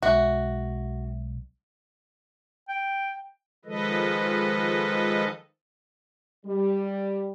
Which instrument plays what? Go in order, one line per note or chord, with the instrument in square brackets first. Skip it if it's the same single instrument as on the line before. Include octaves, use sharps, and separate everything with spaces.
[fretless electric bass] B1 G#3 [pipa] F#4 [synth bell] E5
[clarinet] G5
[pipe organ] D#3 F3 G#3 A4 B4 D#5
[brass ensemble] G3